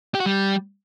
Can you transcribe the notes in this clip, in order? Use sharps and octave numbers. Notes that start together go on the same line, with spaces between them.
G4
F#4
G3